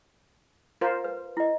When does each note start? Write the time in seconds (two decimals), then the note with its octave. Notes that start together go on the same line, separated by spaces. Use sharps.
0.81 F4 A#4 C5
1.04 B4
1.37 E4 D#5